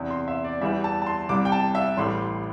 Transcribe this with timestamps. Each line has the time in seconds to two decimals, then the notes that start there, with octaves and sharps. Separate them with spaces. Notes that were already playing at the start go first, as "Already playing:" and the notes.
Already playing: E2 C3 E3
0.11 C6
0.28 E5
0.44 D5
0.61 E2 E3 G3 E5
0.84 A5
1.02 A5
1.06 C6
1.29 C2 C3 G3 D6
1.45 G5
1.52 A5
1.75 E5
1.97 A1 A2 G3 C6